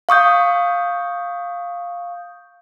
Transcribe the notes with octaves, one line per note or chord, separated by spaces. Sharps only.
F5 C#6 D#6 G6